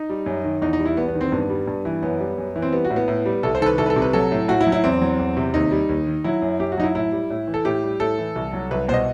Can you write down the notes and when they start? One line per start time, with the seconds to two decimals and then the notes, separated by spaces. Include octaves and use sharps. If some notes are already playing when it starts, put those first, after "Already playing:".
Already playing: D#4
0.10 G3
0.26 F#2
0.44 D#3
0.61 E2 D#4
0.73 D#4
0.79 G3
0.86 E4
0.97 E2 B3
1.08 B3
1.14 D#3
1.21 C4
1.32 G2 B3
1.50 G3
1.67 G2
1.85 E3
2.03 F#2 B3
2.20 G3
2.38 F#2
2.56 E3
2.62 C4
2.72 G3 B3
2.85 F#4
2.90 A2
2.96 B3
3.08 A2
3.26 G3
3.43 C2 A4
3.55 C5
3.60 D#3 A4
3.66 B4
3.78 C2 A4
3.86 B4
3.90 A4
3.96 C3
4.02 B4
4.13 F#3 A4
4.32 A2
4.48 A2 F#4
4.61 E4
4.67 F#3
4.72 E4
4.84 E2 C4
5.02 F#3
5.19 E2
5.37 C3
5.54 D#2 D#4
5.71 G3
5.89 D#2
6.07 D#3
6.24 F#3 E4
6.42 F#2
6.59 F#2 G4
6.72 F#4
6.78 F#3 D#4
6.83 E4
6.95 A2 E4
7.12 G3
7.30 A2
7.48 E3
7.54 A4
7.65 A2 G4
7.83 G3
8.00 A2 A4
8.18 E3
8.36 C2
8.53 F#3
8.71 C2 B4
8.89 B2 C5
8.94 D#5